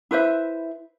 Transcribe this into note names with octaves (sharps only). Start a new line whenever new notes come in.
E4 B4 C5 E5